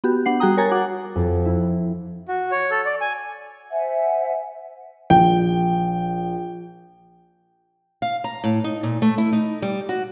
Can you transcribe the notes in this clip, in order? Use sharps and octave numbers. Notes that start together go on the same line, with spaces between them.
B3 F#4 G4
B3 D4 F#5 C7
G3 F#4 G#4 G5 A#5 D#6
A#4 C#5 G#5 A#5 G#6 A6
F#4 F#5 D6
F2
E4
F#4
C#5
A4
D5
G#5
C5 E5 F#5 G#5
A#1 G5
F5
A#5
A2
D#4
A#2
A3
E4
D#4
G3
F#4